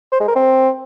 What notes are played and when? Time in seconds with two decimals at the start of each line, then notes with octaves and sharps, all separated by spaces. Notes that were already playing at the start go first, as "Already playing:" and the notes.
0.12 C5
0.20 G#3
0.28 A#4
0.36 C4